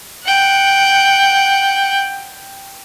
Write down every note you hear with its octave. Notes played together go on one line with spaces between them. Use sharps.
F#5 G5